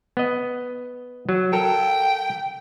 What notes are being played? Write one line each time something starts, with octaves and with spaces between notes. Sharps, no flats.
B3 D#5
F#3
A4 A#4 G5